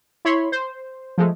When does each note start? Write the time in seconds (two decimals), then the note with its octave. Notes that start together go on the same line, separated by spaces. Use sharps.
0.25 E4 C#5 B5 C6
0.52 C5
1.18 F3 G#3 A3